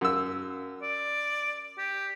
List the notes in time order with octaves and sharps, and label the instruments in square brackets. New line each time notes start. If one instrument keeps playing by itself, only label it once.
[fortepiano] F#2 E6
[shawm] D5
G4